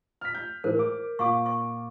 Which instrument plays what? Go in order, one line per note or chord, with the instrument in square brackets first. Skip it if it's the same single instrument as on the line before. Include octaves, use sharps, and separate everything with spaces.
[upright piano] F6 B6
G6
[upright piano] A2 E3 G#3 [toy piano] A#4 C5
[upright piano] D6
[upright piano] A#2 D6 [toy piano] F5 C#6
[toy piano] C#6